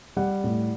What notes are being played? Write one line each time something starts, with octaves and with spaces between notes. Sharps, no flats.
G3 F#5
A2